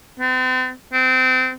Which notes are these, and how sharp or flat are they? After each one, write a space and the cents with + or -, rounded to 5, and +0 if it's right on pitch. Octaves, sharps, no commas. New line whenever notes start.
C4 -40
C4 -25